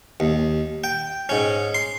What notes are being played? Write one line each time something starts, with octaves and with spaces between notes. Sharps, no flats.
D#2
G5
G#2 C#4
C6